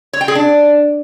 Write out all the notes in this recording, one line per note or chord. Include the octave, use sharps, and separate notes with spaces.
C#5
G5
G#4
D4